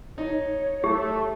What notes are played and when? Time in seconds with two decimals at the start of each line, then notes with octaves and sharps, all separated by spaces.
0.18 D#4 C#5
0.84 A3 G4